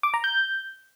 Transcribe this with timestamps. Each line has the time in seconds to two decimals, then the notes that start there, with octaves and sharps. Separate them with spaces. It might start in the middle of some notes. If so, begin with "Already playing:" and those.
0.03 D6
0.14 A#5
0.24 G6